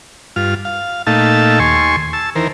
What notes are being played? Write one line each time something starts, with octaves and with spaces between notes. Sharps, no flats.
G2 F4 F6
F5
A#2 A3 D#4 F5 A5 E6
D#2 G#5 C6 C#6
A5 E6
D#3 E3 A#4 C5